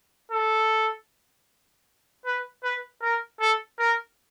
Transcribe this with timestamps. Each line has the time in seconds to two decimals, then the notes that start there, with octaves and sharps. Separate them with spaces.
0.32 A4
2.25 B4
2.63 B4
3.02 A#4
3.41 A4
3.79 A#4